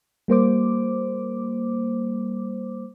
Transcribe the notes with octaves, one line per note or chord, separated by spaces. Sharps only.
G3 A#3 C5 D6